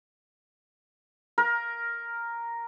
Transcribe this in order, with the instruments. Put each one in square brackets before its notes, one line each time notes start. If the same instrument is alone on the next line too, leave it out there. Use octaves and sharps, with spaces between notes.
[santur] A#4